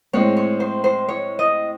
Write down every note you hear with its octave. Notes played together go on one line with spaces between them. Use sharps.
A2 G#3 C4 C#5
C#5
C5
C5
C#5
D#5